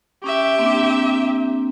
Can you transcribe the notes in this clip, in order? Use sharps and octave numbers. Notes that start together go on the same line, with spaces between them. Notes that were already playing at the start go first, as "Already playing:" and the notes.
C#4 G4 E5
A#3 C4 D4